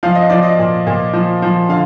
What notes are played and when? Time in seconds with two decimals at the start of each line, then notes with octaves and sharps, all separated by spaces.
0.03 F3 F5
0.15 D#5
0.30 F3 D5
0.43 D#5
0.59 A#2
0.87 A#2
1.13 F3
1.42 F3
1.69 D3 F5